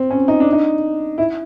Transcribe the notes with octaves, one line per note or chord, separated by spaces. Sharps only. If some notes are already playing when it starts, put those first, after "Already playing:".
Already playing: C4
C#4
D#4
D4
D#4
E4